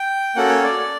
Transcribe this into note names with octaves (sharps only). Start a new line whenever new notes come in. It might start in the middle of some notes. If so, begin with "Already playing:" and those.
Already playing: G5
A#3 C#4 F#4 A4 F#5
C#5
D5